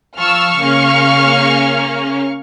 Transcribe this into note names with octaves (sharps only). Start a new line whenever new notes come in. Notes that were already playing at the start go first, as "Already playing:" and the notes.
F3 F5 A5 C#6 E6 F6
C#3 A#3 C#4